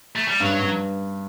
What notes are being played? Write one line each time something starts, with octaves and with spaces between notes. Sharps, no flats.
A3
G3
G2 F#3
G2